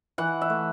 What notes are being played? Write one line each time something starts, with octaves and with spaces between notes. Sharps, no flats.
E3 F#5
E5
A3